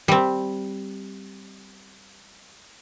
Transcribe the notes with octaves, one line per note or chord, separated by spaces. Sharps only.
G3 C4